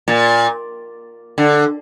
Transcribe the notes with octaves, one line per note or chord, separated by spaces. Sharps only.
A#2
D3